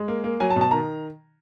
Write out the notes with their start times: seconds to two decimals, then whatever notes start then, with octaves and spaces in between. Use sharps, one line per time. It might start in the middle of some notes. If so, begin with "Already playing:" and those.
Already playing: G#3
0.08 A#3
0.24 A#3
0.40 F#3 G#5
0.50 A5
0.56 B2
0.61 A5
0.71 D#3 A#5